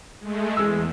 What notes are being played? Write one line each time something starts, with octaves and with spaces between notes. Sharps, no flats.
G#3 A3
E2 G#3 E6